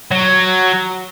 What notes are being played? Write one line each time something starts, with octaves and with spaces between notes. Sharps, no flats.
F#3